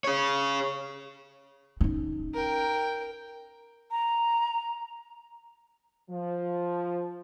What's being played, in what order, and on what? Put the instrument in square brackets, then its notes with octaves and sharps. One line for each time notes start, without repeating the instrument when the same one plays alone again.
[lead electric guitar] G#4 C#5
[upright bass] C#4 D#4
[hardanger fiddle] A#4 G5
[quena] A#5
[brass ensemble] F3